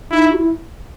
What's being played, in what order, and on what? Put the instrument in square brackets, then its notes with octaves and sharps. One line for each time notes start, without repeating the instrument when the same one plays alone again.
[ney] D#4 [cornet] E4
[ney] F#4
E4